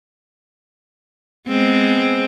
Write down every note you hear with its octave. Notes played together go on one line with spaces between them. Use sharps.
G#3 B3 C4